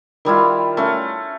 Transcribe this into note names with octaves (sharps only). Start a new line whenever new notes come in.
D#3 G3 E4 F4
A3 C#4 F5